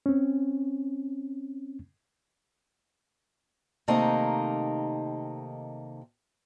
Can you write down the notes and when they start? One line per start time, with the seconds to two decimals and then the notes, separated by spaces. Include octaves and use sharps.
0.06 C4 C#4
3.88 C3 D#3 A3 A#3 D#4